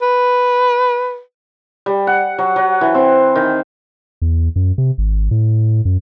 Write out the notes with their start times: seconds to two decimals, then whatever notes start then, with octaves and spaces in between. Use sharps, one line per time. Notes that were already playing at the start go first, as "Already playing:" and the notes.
0.02 B4
1.86 G3
2.07 F#5
2.38 F#3
2.56 F#3
2.81 E3
2.94 C4
3.36 D#3
4.22 E2
4.56 F#2
4.78 C3
4.98 G#1
5.31 A2
5.85 F#2